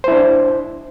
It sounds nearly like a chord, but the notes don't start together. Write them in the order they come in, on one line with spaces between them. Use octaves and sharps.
C5 E4 D4